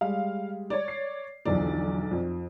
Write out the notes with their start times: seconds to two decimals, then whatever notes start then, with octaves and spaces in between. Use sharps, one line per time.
0.01 G3 G#3 F5
0.70 C#5 D5
0.88 C7
1.46 B1 E2 D3 F3 D5
2.11 F2